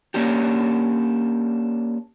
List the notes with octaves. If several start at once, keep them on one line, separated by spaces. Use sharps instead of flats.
A#3 C#4 D4 G4